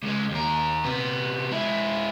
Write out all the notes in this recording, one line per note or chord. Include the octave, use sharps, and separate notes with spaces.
C#2 G#3
D#2 A#4
C3 B3
G#3 E4